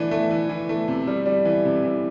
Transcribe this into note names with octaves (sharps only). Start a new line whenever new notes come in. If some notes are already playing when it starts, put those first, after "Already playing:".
Already playing: E3 A3 D4
A3
E3
E3
A3
C3
G3
G3
E3
C3
E3